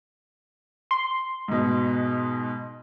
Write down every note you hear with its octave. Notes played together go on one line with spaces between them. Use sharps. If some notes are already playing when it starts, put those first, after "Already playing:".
C6
G#2 B2